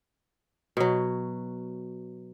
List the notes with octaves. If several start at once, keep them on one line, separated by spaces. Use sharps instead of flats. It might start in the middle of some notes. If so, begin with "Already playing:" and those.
B2 F#3